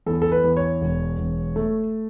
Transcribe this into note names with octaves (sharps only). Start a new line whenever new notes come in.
E2 A4
A4
B4
E2
C#5
E1
E1
A3